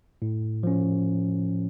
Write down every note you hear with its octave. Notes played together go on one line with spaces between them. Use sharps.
A2
F3 C#4